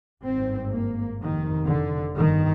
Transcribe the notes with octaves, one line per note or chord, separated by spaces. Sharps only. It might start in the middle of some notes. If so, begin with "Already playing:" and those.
G#1 G2 C4
A#3
F1 F2 C3 D#3
D3
G1 G2 D#3